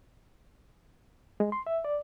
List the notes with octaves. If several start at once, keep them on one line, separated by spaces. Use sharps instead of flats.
G#3
C6
E5
D5